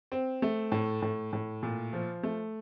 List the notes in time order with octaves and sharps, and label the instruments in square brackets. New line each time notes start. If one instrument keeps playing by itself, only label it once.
[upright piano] C4
A3
A2
A2
A2
A#2
F3
A3